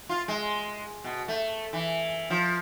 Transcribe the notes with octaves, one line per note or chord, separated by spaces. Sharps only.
F4
G#3
B2
A3
E3
F3